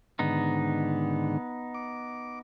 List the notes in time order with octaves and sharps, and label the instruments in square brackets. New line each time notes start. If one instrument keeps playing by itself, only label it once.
[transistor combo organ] G#2 D3 D#3 [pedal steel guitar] B3 D#4
[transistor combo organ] D6